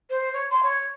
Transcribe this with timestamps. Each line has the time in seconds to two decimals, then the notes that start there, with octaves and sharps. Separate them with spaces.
0.10 C5
0.33 C#5
0.51 C6
0.63 C#5